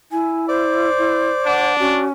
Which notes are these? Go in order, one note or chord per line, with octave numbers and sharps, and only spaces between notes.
E4 G#5
C5 D5
E4
D4 F#5
C#4 F#4